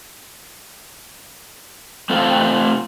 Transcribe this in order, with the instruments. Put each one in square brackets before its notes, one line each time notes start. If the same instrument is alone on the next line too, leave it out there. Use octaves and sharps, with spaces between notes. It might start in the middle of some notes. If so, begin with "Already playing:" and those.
[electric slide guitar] A3 C4 F4 A4